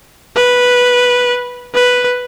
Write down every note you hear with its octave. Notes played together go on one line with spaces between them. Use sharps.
B4
B4